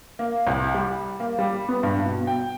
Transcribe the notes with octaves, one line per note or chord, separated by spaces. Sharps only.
A#3
C2
G3
A#3
G3
B3
G2
B2
G5